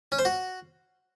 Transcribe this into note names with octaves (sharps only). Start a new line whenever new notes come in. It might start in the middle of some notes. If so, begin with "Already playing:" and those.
C#4
C5
F#4